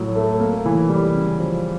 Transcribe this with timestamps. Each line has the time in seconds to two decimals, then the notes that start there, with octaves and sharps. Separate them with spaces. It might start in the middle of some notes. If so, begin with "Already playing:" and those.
Already playing: A2 F#3
0.15 A3
0.40 A#3
0.65 E3
0.89 G3
1.14 C#3
1.39 F3